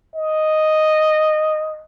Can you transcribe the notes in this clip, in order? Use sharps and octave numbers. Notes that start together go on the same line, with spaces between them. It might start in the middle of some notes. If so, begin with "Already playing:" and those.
D#5